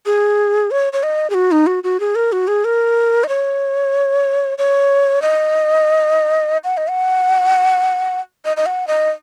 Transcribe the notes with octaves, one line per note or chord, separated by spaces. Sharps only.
G#4
C#5
C#5
D#5
G#4
F#4
D#4
F#4
F#4
G#4
A#4
F#4
G#4
A#4
D#5
C#5
C#5
D#5
F#5
D#5
F#5
D#5
D#5
F#5
D#5